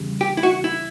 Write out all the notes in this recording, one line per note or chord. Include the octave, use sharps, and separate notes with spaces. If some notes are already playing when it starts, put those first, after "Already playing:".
Already playing: E2 C#3 G3
G4
E4
F#4
E4